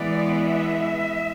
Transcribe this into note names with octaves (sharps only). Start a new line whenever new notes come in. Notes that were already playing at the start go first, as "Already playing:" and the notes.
Already playing: E3 G#3 B3 D5
E5